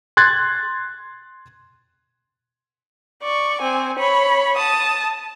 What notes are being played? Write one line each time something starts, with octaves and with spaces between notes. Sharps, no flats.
C6 F#6 G#6 A6
D5 C#6
C4 G#5
C#5 B5
A5 D#6